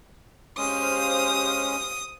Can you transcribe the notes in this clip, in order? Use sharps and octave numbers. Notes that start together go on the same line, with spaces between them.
G#3 C#4 G4 C5 F5 D#6